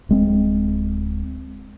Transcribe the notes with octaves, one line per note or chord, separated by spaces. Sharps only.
D1 G#3 C4